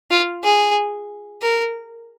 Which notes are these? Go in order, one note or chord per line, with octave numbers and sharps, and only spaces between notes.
F4
G#4
A#4